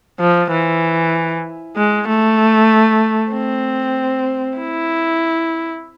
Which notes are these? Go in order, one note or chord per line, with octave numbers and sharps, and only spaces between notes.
F3
E3
G#3
A3
C4
E4